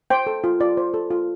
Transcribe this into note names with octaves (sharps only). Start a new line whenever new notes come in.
C5 G5
A4
F4
F4 D5
C5
A4
F4